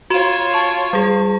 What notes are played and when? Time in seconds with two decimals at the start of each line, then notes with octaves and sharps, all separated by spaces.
0.10 F4 F#4 C#5 C6 E7
0.54 A5 C#6
0.93 G3 G#4